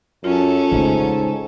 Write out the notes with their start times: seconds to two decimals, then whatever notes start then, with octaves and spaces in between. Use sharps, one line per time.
0.24 F#2 C#4 F4 A4
0.72 G#2 C#3 A3